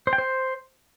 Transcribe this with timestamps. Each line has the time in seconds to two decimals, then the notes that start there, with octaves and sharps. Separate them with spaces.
0.07 C5
0.13 G5
0.18 C5